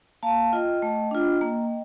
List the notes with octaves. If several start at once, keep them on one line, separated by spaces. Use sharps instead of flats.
A#3 F5 A5
F4 D#5 G5
A3
D4 F4
A#3